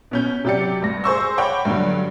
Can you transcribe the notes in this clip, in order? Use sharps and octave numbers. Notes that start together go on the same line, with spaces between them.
B2 C#4 G6
C3 F#3 G4 D5 C#7
D2 G2 A#6
G#4 C5 C#6 E6
C#5 F#5 G5 B5 C#6 D6
G2 D3 F#3